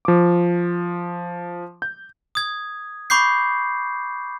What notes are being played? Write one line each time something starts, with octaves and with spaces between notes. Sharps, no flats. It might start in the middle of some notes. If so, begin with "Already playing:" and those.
F3 D6
G6
D#6 G#6
B5 C#6 D6 G6 C7